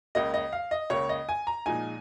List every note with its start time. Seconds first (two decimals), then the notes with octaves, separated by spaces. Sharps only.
0.15 C#2 C#3 A#3 D#5
0.34 D#5
0.53 F5
0.71 D#5
0.90 C#2 C#3 A#3 C#5
1.09 D#5
1.29 G#5
1.47 A#5
1.66 A#2 F3 G#3 D#4 G#5